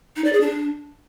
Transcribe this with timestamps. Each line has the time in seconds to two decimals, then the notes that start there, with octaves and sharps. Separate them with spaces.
0.16 D#4
0.24 D5
0.33 G#4
0.41 D4